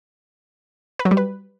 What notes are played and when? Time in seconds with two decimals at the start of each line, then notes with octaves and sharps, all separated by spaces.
0.99 B4
1.05 F#3
1.11 G3
1.17 B4